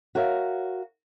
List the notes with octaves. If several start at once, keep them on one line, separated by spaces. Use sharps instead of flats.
F#4 A#4 C#5 E5 F5